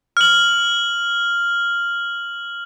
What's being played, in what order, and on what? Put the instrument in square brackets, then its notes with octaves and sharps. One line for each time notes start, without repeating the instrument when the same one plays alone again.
[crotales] F6 F#7